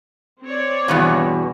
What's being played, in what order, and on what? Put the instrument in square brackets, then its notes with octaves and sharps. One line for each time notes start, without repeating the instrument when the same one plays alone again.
[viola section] C4 C#5 D5
[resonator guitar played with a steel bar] E2 G2 B2